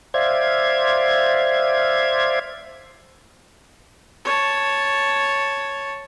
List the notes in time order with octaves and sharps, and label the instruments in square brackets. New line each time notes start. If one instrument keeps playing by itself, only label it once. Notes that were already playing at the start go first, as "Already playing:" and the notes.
[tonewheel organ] C5 D5 E5 F5 G#6
[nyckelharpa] C#5 A5